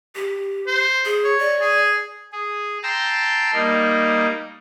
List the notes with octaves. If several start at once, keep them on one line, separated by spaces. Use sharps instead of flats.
G4
C5
G#4
C#5
D5
G#4
G#4
G5 A5 A#5 C6 E6
G3 A#3 D#4